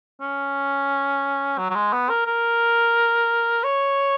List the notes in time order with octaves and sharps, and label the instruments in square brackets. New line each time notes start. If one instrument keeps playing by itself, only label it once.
[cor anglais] C#4
F#3
F#3
G#3
B3
A#4
A#4
C#5